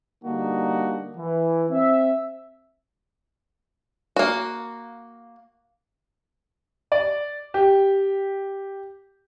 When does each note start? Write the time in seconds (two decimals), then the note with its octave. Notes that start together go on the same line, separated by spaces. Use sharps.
0.24 D3 G3 A#3 D4 D#4 F#4
1.17 E3
1.70 C4 E5
4.16 A#3 F#4
6.92 D5
7.54 G4